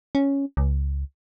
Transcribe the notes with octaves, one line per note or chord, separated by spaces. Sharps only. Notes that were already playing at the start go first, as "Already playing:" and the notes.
C#4
C#2